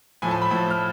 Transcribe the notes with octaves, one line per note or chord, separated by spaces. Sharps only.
A2 F3 A3 G#5
A5
B5
A2 F3 A3
F6